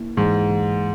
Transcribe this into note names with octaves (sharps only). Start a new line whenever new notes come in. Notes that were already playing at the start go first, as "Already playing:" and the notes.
Already playing: A#3 E4
G#2 E3
E3